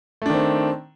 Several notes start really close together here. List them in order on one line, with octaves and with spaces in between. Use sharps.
A3 D4 D#3 C4